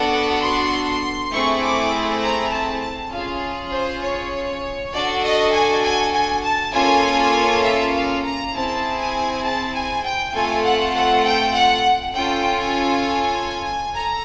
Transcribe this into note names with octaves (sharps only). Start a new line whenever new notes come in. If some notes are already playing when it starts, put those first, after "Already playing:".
Already playing: B3 D4 F#4 A4 F#5
C6
A3 C4 E4 G#4 C#6
D6
A#5
A5
A5
C#4 F4 G#4 F5
C5
C#5
D4 F#4 A4 D5
D#5
G#5
G#5
G#5
A5
A#3 C#4 F4 A4 G#5
E5
F5
A#5
C4 E4 G#4 A5
G#5
A5
G#5
G5
A3 C4 F4 A4 G#5
F#5
F#5
G5
F#5
C#4 F4 A4 G5
G#5
A4 A#5